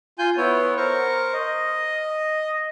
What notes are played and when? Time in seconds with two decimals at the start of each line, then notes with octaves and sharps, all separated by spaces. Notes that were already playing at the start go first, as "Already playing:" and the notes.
0.19 F4 G#5 G6
0.37 B3 E4 C#5
0.77 A#4 C5 C#6
1.34 D#5